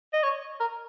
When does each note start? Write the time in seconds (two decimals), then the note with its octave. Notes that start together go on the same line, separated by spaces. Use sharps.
0.13 D#5
0.23 C#5
0.60 A#4